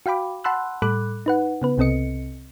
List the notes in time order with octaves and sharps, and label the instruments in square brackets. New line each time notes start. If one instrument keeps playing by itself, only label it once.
[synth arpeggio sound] F#4 F5 G5 B5 D6
F#5 A5 B5 C6 E6 F#6
A2 G3 A4 B5 D6 F#6
D#4 B4 F#5
C#3 B3 B4
C2 C3 C4 A4 D#5 C#7